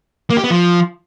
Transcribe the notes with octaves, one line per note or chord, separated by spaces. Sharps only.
A#3
G4
B3
F3